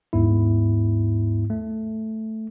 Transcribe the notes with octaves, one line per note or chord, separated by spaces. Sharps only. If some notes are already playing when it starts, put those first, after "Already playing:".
D#2 G#2 B3 E4
A3